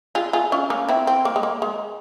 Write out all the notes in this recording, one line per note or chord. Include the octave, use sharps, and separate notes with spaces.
F4 G#4
F4 G#4
C#4 F4
A#3 C#4
C4 E4
C4
A#3
G#3
A#3
G#3